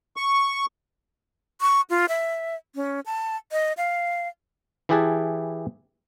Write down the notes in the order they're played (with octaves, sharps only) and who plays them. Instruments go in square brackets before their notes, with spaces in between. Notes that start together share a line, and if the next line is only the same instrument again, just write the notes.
[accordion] C#6
[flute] C#6
F4
E5
C#4
A5
D#5
F5
[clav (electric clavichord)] E3 E4 G4 G#4 B4 A5